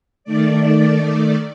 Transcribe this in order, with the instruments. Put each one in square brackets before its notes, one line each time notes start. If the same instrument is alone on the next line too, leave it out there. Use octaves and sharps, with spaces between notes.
[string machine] D#3 A3 D5